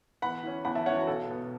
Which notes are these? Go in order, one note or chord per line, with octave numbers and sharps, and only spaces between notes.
E2 F#5 B5
E3 C#4
E2 F#5 B5
E5 A5
E3 C#4 C#5 F#5
F#4
B1 A4
B2 B3